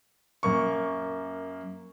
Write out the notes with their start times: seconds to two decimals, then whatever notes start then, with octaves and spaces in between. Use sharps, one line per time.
0.43 F#2 A#3 C#6